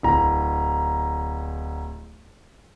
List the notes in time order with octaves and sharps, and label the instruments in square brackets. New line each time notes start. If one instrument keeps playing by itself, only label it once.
[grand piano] D1 A#5